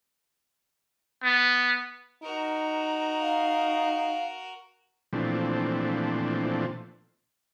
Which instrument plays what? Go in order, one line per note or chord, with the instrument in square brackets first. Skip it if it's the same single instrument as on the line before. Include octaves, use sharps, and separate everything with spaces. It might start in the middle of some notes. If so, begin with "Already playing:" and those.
[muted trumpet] B3
[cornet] D#4 [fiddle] F#4 A#4
[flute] F5
[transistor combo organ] A#2 E3 F3 A3 C4 D4